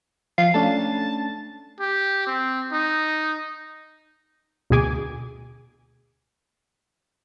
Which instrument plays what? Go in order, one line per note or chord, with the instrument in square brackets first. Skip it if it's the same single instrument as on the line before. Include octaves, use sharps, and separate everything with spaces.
[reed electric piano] F3 [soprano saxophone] F5
[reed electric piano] A3 C#4 D4 [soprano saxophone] A5
[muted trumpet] G4
C4
D#4
[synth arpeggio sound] D2 B2 G#4 G#5 D6